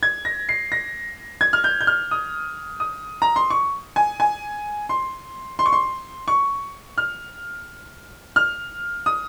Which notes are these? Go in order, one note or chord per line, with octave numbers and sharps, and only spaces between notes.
G#6
A#6
C7
A#6
G#6
F6
G6
G6
F6
D#6
D#6
A#5
C6
C#6
G#5
G#5
C6
C6
C#6
C6
C#6
F6
F6
D#6